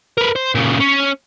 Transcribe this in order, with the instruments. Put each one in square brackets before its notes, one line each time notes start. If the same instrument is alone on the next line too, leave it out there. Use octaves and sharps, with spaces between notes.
[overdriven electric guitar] A#4 B4
C5
A#2 C#3
C#4